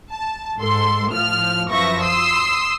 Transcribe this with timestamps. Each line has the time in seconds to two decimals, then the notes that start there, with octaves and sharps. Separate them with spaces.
0.11 A5
0.59 G#2 A4 C6
1.12 A2 F3 F6
1.69 F#2 F3 B4 E5 C#6 A#6
2.04 C6 D#6 E6 C7